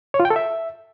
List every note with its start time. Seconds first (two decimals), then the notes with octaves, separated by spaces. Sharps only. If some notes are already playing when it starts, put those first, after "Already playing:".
0.14 C#5
0.20 F4
0.25 G5
0.30 A4
0.36 E5